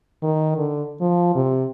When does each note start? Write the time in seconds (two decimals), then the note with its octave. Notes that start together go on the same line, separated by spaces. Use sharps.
0.23 D#3
0.57 D3
1.01 F3
1.35 C3